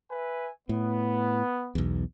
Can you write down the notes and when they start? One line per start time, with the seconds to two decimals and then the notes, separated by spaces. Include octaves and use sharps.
0.11 B4 E5 G#5
0.69 A2 B3
1.75 B1 E2